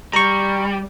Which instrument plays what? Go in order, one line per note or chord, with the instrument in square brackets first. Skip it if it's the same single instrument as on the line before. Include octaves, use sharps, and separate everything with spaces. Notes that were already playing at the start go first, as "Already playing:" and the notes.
[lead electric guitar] G3 [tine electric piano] A#5 C#6